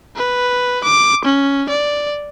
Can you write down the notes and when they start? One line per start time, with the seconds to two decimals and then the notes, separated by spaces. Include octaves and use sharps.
0.17 B4
0.84 D6
1.25 C#4
1.70 D5